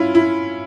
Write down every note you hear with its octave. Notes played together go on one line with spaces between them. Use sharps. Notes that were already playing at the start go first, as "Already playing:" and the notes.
Already playing: C#4 E4 F4
E4